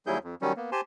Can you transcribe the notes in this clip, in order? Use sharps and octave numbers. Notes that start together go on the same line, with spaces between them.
D#2 F#3 G3 E4 G#4 G6
F2
D#3 F#3 G3 C#4
A#3 B3
G4 C5 G#5 A5 C6